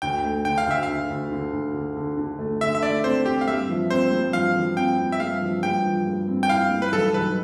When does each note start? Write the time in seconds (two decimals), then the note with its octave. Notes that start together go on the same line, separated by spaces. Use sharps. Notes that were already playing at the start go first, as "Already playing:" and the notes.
0.02 D2 G5
0.24 A3
0.45 D3 G5
0.58 F5
0.67 D2 E5
0.83 F5
0.89 D3
1.10 D2
1.32 D3
1.53 D2
1.74 D3
1.97 D3
2.17 D3
2.39 A3
2.61 D3 E5
2.75 E5
2.82 A3 D5
3.04 C4 C5
3.26 C4 G4
3.41 F5
3.47 G2 E5
3.69 F3
3.90 C4 C5
4.12 G2
4.33 F3 F5
4.56 F3
4.77 C4 G5
4.99 C4
5.12 E5
5.20 G2 F5
5.42 F3
5.63 G2 G5
5.85 F3
6.07 G2
6.28 C4
6.43 G5
6.49 E4 F5
6.71 G2
6.82 B4
6.93 B1 A4
7.14 B1 B4